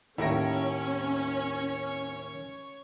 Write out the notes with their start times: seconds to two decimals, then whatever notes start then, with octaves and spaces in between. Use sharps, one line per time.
0.18 D#2 A2 C#4 E4 A#4 C#5 C#6 A#6